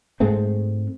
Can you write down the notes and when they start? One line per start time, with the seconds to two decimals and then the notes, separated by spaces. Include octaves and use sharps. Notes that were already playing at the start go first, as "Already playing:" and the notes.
0.20 G#2 G#3 A3 C4